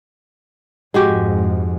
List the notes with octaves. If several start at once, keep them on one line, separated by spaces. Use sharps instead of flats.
F2 G#2 G#3 F#4 G4